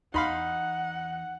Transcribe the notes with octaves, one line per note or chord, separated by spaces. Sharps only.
E2 D#4 F5 F#5 B5 C6